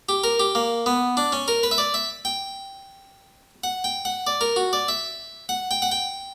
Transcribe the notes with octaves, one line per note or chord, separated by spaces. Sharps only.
G4
A#4
G4
A#3
B3
D4
C#4
A#4
B4
E5
D5
E5
G5
F#5
G5
F#5
D5
A#4
F#4
D5
E5
F#5
G5
F#5
G5